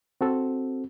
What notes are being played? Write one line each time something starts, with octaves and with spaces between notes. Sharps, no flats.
C4 F#4 A4